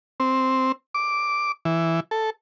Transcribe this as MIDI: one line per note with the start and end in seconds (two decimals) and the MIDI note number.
0.20 0.72 60
0.94 1.52 86
1.65 2.00 52
2.11 2.30 69